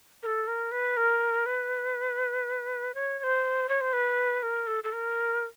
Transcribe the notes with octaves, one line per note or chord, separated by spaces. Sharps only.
A#4
A4
A#4
B4
A#4
B4
C#5
C#5
C5
C#5
C5
B4
A#4
A4
A4
A#4